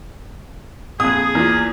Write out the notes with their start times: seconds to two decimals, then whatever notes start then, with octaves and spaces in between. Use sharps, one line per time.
1.00 A#1 F2 G#4 D#6
1.35 E2 A#3 F4